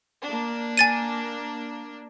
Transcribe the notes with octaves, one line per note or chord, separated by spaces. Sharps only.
A#3 D4
G#5 A6 D#7